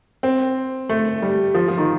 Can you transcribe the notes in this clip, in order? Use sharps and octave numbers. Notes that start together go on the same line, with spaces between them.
C4
A3
G3
F3
F3
D#3